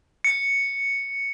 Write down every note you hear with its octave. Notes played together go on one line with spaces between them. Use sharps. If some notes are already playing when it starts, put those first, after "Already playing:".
C#7